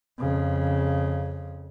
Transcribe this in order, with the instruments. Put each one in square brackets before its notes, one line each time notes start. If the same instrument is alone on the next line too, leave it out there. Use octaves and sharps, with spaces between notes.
[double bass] F2 C#3